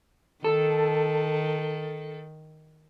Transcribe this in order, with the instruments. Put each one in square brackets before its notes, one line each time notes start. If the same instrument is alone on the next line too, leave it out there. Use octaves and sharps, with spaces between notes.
[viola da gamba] D#3 [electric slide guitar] A4